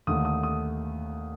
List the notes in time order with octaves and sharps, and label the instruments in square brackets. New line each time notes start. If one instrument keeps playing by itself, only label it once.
[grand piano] D#2 D3 A3 D#6
D#6
D#6